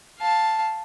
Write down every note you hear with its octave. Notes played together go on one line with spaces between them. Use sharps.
F5 A5